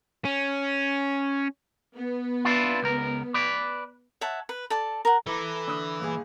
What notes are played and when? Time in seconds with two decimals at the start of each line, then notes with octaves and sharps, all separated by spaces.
0.25 C#4
1.96 B3
2.45 D4 E4 F4
2.82 C#2 A#4
3.34 B4 D5
4.21 C#5 E5 F#5 A5
4.49 B4
4.70 A4 D5 A5
5.05 A#4 F#5
5.26 E3 E4 A4 A#5 B5 D6 A#6
5.67 D3 D#6
5.99 G1 A#2 G#4